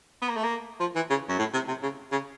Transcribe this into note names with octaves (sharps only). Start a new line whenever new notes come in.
B3
A#3
A3
A#3
F3
E3
C#3
F#2
A2
C3
C3
C#3
C#3